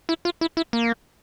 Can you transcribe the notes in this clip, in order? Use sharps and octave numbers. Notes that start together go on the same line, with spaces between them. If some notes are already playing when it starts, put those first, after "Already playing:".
E4
F4
E4
E4
A#3